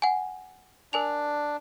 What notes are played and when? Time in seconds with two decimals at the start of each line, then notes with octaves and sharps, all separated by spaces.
0.02 F#5 G#5
0.93 D4 A#4 G#5 F7